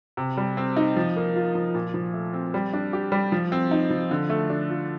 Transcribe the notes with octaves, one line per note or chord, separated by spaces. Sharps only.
C3
G3
C4
D#4
F3
A#3
F4
F3
A#2
F3
A3
C4
G3
D4
G4
G3
F3
C4
D#4
F3
D3
A3
D4
F4